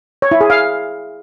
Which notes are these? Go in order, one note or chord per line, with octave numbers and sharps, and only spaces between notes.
C#5
E4
G#4
F5